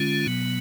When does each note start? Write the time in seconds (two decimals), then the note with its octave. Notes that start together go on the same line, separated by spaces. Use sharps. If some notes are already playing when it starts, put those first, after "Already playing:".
Already playing: D3 G#3 C#4 F4
0.26 B2 F#3 B3